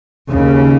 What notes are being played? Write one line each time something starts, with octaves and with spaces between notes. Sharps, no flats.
D#2 C#3